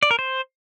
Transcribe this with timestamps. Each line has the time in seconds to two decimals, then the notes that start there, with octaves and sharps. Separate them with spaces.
0.03 D5
0.11 A#4
0.19 C5